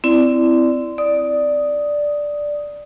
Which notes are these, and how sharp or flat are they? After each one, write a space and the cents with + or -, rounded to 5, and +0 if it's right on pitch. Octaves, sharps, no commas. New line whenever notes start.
C4 -20 E4 +5 D5 +0
D5 +0 D#6 +5